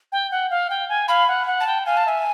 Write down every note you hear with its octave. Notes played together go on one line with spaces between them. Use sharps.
G5
F#5
F5
G5
G#5
F5 B5
F#5
F#5
A5
G5
F5 G#5
A5
E5 G#5